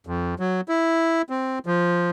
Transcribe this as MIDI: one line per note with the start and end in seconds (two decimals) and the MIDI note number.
0.07 0.35 41
0.40 0.61 54
0.68 1.22 64
1.30 1.59 60
1.66 2.11 53